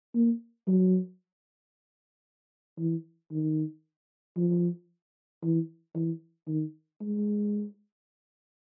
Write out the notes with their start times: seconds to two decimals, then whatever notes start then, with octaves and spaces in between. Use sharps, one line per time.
0.15 A#3
0.67 F#3
2.79 E3
3.32 D#3
4.37 F3
5.43 E3
5.95 E3
6.48 D#3
7.01 G#3